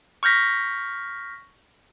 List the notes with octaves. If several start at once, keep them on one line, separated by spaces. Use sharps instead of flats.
C#6 F6 G6 A#6 B6